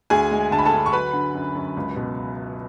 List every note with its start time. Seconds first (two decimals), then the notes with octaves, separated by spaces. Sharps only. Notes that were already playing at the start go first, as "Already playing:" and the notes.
0.10 D2 G#4 G#5
0.31 G#3
0.51 D3 A5
0.59 B5
0.65 A4 A5
0.73 D3
0.86 C#6
0.93 F#3 B4 B5
1.13 D3
1.34 F#2
1.55 F#2
1.77 C#2
1.96 B2